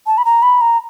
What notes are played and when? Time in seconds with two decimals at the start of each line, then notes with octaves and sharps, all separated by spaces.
0.07 A5
0.18 B5
0.25 A#5
0.42 B5
0.61 A#5